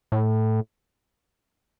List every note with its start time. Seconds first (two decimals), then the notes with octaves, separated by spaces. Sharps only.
0.12 A2